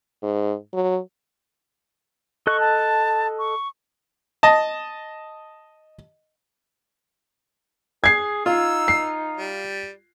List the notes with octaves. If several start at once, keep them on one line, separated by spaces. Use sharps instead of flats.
G#2
F#3
A4 D#5 C#6 F#6
A5
C#6
D#5 A5
G#4 G#6 C7
D#4 F4 E6
C7
G3